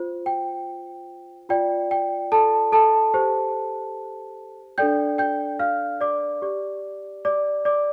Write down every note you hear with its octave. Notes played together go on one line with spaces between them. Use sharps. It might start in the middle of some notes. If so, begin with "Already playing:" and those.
Already playing: F4 C5
G5
F4 D5 G5
G5
A4 A5
A4 A5
G4 C5
D4 A4 D5 G5 G6
G5 G6
F5 F6
D5 D6
G4 D5
D5 D6
D5 D6